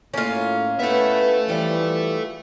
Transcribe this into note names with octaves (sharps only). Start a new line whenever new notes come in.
A2 A#3 C#4 F4
B3 E4 A4 B4 E5
E3 F3 G3